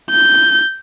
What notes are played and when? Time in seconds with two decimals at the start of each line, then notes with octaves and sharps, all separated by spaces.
0.10 G6